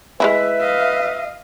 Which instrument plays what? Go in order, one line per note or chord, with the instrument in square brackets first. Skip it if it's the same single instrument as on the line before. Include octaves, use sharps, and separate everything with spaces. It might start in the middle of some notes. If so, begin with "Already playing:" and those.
[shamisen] G#3 D#4 E4 [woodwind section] B4 E5
[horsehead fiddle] D#5 F5